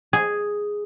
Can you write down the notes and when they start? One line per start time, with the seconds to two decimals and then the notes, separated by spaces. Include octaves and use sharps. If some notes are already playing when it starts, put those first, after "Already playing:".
0.13 G#4